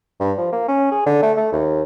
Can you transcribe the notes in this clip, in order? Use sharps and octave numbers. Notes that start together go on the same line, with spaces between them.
G2
F3
A#3
C#4
G#4
D3
A3
A3
D#2